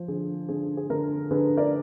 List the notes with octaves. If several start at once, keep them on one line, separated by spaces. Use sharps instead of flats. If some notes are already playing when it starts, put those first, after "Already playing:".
Already playing: F3
D3 G#4
D3 G#4
G#4
D3 A#4
D3 G#4 B4
A#4 D5